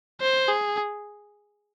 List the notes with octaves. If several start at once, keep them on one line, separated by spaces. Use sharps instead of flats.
C5
G#4